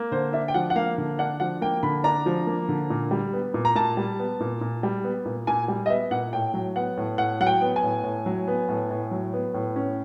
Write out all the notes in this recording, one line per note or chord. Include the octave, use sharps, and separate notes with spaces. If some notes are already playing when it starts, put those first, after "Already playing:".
Already playing: A#3
D3 C5
D4 E5
G5
F3 F#5
F#5
A#3 F5
D3
D4 F#5
F3 F#5
A#3 G5
D3 B5
D4 A#5
F3
A#3
D3
A#2
G3
B3
A#2
A#5
A#2 A5
G3
B3
A#2
A#2
G3
B3
A#2
A#2 G#5
G3
D#5
B3 E5
A#2 F#5
A2 G5
F#3
B3 F#5
A2
A2 F#5
F#3 F#5
G5
B3
G#5
A2
A2
F#3
B3
A2
A2
F#3
B3
A2
C#4